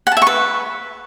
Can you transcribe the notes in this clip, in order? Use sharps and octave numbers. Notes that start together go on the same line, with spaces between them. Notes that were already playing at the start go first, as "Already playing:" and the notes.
F#5
A5
E5
C#6
B4